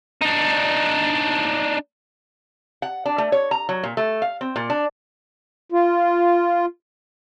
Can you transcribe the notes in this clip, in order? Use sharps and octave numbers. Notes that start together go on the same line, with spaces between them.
D4 D#4
F#5
D4
A3
C#5
A#5
F#3
A#2
A3
F5
C4
A#2
D4
F4